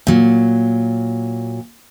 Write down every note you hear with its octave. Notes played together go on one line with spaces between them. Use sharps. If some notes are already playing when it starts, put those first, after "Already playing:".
A#2 F#3